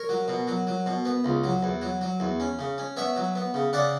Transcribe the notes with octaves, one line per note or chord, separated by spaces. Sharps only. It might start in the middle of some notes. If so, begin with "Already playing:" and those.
Already playing: A#4 C#5
F#3
B2
F#3
F#3
B2
B3
C#2
F#3
E2
F#3
F#3
E2
C#4
C#3
C#4
B3 C#5 E5
F#3
B3
C#3
C#3 D5 F#5